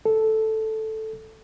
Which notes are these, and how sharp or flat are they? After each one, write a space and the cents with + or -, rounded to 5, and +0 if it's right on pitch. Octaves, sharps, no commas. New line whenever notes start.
A4 +0